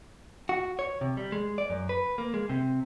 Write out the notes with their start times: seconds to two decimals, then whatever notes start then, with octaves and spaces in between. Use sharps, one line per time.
0.49 F#4
0.79 C#5
1.01 C3
1.17 G3
1.32 G#3
1.58 D5
1.70 F#2
1.89 B4
2.18 A#3
2.34 G#3
2.49 C3